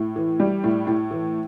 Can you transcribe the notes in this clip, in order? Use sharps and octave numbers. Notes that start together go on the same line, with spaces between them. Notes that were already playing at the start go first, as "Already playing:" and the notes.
Already playing: A2
E3
G3
A2
A2
E3